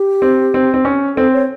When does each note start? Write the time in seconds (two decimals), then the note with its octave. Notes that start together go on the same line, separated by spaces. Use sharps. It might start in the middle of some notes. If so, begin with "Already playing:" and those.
Already playing: G4
0.22 C4
0.54 C4
0.74 C4
0.85 C#4
1.16 C4 A4
1.33 C#5